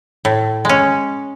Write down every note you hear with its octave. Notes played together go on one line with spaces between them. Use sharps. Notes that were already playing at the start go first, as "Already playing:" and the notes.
A2
G#3 C#4